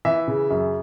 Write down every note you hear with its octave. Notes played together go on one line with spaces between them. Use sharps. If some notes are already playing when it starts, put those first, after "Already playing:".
E3 E5
C#3
F#2